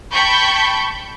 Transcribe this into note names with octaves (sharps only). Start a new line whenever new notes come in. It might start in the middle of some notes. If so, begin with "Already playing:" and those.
G5 A5 B5 C#6 G6